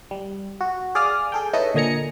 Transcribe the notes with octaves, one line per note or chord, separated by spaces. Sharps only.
G3
F#4
G#4 D5 F5 D#6 F6
G#4 A4 G5
D#4 E4 A4 B4 C#5 D#5
A#2 D3 D#5 G#5 A#5 C#7